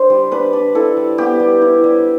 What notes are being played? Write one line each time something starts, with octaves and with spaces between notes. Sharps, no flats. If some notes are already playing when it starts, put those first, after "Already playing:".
Already playing: D4 C5
G3
D4 B4
D4
E4 A4
G3
B3 G4
G3
E4
G3